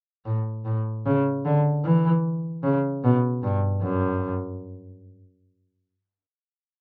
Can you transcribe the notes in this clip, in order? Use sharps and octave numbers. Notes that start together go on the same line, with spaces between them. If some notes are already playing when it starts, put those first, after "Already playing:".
A2
A2
C#3
D3
E3
C#3
B2
G2
F#2